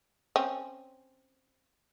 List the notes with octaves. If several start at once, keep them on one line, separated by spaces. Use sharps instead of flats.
C4 C#4